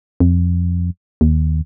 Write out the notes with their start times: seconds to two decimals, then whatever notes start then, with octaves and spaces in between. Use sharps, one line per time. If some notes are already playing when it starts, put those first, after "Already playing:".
0.20 F2
1.21 D#2